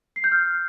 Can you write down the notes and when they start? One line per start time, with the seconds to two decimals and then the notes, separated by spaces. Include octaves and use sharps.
0.16 C7
0.24 G6
0.32 F6